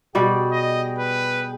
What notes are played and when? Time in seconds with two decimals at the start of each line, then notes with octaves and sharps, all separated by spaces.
0.15 B2 G3 G#4 D5 G5
0.52 D#5
0.99 B4